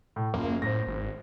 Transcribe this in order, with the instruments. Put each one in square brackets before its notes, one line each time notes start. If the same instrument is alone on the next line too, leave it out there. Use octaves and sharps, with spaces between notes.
[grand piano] A2
[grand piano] F#1 F4 [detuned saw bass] A#3
[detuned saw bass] A2 [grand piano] C5 A#6
[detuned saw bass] G#1